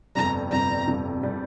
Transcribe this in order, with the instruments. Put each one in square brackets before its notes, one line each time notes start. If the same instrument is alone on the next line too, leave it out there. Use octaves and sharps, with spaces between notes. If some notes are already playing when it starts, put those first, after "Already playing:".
[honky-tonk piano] G1 F2 C3 G3 [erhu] A#5
[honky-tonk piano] G1 F2 C3 G3 [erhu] A#5
[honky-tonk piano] G1 F2 C3 G3
C3 G3